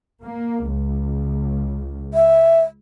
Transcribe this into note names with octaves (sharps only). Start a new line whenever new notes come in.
A#3
C#2
E5